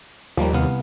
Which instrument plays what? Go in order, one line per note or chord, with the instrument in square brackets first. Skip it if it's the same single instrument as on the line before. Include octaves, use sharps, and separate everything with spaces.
[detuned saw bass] D#2 [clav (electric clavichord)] F3 G3 A#3
[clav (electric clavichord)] C2 B3 F5